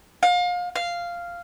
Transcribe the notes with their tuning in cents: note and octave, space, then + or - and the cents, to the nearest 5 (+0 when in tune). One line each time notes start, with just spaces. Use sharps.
F5 +30
F5 -5